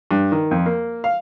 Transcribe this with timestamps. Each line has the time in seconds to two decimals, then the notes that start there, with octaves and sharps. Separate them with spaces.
0.11 G2
0.32 D#3
0.51 F2
0.66 A#3
1.04 F5